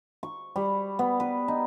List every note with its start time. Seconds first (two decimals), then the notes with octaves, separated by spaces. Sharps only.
0.23 C#6
0.56 G3
0.99 B3
1.20 B4
1.48 D#4